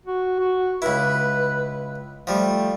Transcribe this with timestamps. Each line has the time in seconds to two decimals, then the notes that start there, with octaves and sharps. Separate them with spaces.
0.06 F#4
0.40 F#4
0.82 C#2 E4 B4
2.27 F3 G3 A3